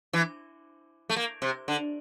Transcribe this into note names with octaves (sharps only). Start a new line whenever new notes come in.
E3
A3
A#3
C3
D3